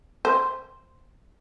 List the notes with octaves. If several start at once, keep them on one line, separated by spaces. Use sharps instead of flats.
C5